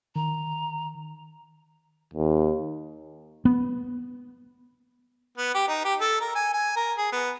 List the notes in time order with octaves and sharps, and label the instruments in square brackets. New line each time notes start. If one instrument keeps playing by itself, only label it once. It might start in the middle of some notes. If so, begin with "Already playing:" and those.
[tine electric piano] D#3 [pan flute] A#5
[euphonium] D#2
[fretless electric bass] B3
[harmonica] B3
G4
D#4
G4
A4
A#4
G#5
G#5
A#4
G#4
B3